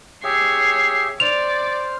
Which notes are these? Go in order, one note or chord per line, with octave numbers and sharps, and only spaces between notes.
G4 G#4 C#5 E5 C7
C5 D5 F6 F7